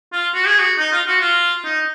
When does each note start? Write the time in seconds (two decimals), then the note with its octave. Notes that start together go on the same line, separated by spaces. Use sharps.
0.13 F4
0.35 F#4
0.47 G#4
0.59 F#4
0.78 D#4
0.92 F4
1.07 F#4
1.21 F4
1.65 D#4